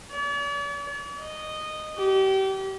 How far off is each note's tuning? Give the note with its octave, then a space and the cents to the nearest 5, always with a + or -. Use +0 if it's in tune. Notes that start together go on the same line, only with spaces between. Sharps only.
D5 -45
D#5 -15
G4 -30